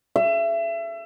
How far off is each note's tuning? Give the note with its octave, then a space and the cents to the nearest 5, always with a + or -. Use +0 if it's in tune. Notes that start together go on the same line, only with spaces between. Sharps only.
E5 +30